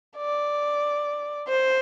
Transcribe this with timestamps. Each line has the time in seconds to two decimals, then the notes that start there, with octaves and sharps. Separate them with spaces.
0.17 D5
1.48 C5